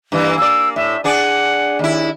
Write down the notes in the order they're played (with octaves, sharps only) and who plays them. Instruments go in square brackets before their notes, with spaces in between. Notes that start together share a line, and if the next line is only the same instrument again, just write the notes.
[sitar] G2 E3 A#3
[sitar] A#3 D5 [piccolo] E6
[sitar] A2 [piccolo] E5
[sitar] D4 G#4 D5 [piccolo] F#5
[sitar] D#2 E4